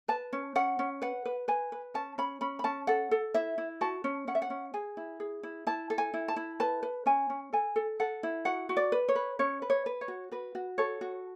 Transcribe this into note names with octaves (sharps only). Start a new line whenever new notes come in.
B4 A5
C#4
C#4 F#5
C#4
B4 F#5
B4
B4 G#5
B4
C#4 A5
C#4 B5
C#4 B5
B5
C#4 A5
A4 F#5
A4
E4 E5
E4
F#4 A5
C#4
C#4 F#5
E5
F#5
C#4
G#4 G#5
E4
G#4
E4
E4 A5
A4
G#5
E4
A5
E4
B4 A5
B4
C#4 G#5
C#4
A4 G#5
A4
A4 F#5
E4
F#4 F#5
F#4
D5
B4
C#5
B4
C#4 C#5
B4
C#5
B4
C#5
F#4
F#4 B4
F#4
A4 C#5
F#4